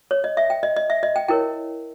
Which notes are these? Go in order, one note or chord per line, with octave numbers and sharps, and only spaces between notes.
C#5
D#5
E5
G5
D#5
D#5
E5
D#5
G5
E4 A#4 C#5 G5